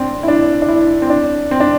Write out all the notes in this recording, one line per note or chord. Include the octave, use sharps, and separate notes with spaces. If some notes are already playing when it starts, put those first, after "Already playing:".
Already playing: C4 D4
E4
D4
D4
E4
C4
D4
C4
D4